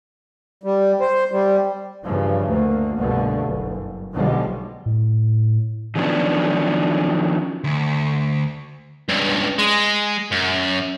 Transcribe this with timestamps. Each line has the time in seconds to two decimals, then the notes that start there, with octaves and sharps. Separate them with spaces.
0.63 G3
1.01 C5
1.32 G3
2.03 G2 C#3 E3 F3
2.48 D2 A#3
2.96 C2 G2 B2 D3 A3
3.46 F#1
4.13 B1 D3 F3 G3 G#3
4.86 A2
5.96 D#3 F3 F#3 B3 C#4 D4
7.64 D2
9.09 C#2 G2
9.58 G#3
10.31 F#2